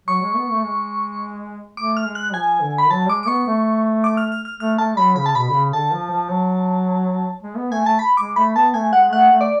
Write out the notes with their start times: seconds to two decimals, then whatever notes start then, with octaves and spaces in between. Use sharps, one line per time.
0.08 F#3 C#6
0.22 G#3
0.36 B3
0.50 A3
0.64 G#3
1.77 A3 D6
1.97 F6
2.06 G#3
2.15 F#6
2.34 F3 G#5
2.62 D3
2.78 B5
2.91 F#3 A5
3.09 G#3 D6
3.23 D6
3.27 B3 C#6
3.47 A3
4.04 D6
4.17 F6
4.32 F6
4.45 F6
4.60 A3 F6
4.78 A3 A5
4.97 F#3 B5
5.16 C#3 B5
5.26 A5
5.35 B2 B5
5.49 D3
5.54 C#3
5.73 D3 A5
5.92 F3
6.10 F3
6.29 F#3
7.42 G#3
7.57 B3
7.71 A3 G#5
7.85 A3 A5
7.99 B5
8.17 G#3 D6
8.36 A3 B5
8.56 B3 A5
8.74 A3 G#5
8.93 G#3 F#5
9.12 A3 F#5
9.31 A3
9.41 D5